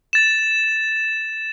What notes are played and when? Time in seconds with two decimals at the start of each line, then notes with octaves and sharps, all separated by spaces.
0.13 A6 E7